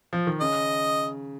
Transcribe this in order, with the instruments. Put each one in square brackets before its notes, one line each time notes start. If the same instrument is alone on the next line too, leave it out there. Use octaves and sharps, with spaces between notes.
[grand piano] F3
D#3
[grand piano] C#3 [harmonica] D#5